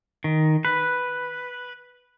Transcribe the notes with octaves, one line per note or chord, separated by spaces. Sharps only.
D#3
B4